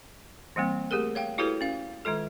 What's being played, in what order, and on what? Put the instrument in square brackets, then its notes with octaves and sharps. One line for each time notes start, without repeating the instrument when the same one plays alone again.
[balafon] E3 G3 A#3 C4
A3 G4 G#4 A#4
C#5 F5 G5
E4 F#4 G4 A4 B4 C#5
C#4 F5
D#3 G#3 F4 A4